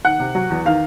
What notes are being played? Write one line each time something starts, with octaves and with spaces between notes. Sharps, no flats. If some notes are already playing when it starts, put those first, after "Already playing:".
D#3 F#5
C3
F#3
E2
D#3 F5